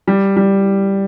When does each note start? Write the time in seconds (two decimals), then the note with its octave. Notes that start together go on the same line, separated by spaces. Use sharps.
0.07 G3
0.37 G3